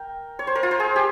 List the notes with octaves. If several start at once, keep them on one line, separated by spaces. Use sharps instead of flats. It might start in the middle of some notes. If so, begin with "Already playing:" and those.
Already playing: A#4 G5
C#5
C5
A#4
F4
C5
G#4
G4